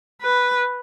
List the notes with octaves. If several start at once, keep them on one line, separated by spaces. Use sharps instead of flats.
B4